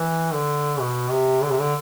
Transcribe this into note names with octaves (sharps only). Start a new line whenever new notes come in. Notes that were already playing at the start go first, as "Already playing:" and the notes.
Already playing: E3
D3
B2
C3
D3
C3
D3